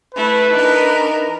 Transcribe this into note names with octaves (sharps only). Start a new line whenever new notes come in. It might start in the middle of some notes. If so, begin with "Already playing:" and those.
A3 E4 B4
E3 D4 D#4 A#4